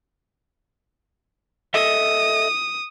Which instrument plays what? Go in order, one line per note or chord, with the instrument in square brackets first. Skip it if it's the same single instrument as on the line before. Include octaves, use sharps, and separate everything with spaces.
[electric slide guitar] A4 D#5 E5 [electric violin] D#6